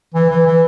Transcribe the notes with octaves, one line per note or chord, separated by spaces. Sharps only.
E3
E3
E3